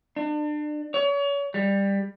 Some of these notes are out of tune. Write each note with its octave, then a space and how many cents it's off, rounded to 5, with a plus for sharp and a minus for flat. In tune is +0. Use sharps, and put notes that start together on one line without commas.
D4 +35
C#5 +35
G3 +15